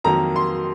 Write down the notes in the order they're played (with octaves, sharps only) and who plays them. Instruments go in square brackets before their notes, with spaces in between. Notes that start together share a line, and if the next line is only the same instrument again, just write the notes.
[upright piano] F2 D#3 F#3 A#3 A#5
C6